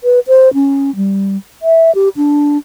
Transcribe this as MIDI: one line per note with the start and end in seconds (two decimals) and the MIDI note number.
0.04 0.19 71
0.27 0.53 72
0.54 0.94 61
0.96 1.37 55
1.62 1.94 76
1.95 2.09 67
2.17 2.58 62